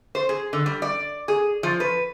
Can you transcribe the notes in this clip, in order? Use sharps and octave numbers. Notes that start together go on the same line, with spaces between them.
C5
G#4
D3
G3
D5
G#4
F3
B4